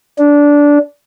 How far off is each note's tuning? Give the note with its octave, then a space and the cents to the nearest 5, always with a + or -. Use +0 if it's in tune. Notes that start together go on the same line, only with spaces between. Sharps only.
D4 -15